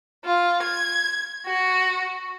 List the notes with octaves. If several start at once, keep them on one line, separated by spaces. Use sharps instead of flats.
F4
G#6
F#4